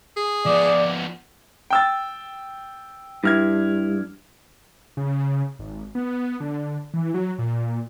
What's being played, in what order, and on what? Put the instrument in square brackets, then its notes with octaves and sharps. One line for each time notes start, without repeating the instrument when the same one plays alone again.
[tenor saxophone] G#4
[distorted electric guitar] F3 B3 [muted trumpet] D5
[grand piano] G5 E6 A6
[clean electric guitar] G2 [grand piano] E4 F6 G#6
[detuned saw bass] C#3
G#1
B3
D3
E3
F#3
A#2